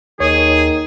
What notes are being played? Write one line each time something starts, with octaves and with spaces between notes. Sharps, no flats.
D#2 D#3 G#4 C#5